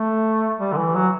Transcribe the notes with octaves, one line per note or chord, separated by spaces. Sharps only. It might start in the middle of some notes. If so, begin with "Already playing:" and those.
Already playing: A3
G3
D3
E3
F#3